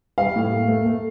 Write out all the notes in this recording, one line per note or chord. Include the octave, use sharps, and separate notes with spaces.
G3 F5
A2
A#3
A3
A3